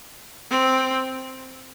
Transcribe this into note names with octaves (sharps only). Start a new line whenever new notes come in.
C4